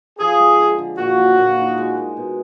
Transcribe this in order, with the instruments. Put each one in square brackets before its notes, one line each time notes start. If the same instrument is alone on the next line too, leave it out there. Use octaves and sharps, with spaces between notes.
[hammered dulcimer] F3 [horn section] G#4
[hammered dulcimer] G#3
D3
D3
[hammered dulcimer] A#2 [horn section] F#4
[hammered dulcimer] F#3
A#2
D#4
G#3
G#3
B2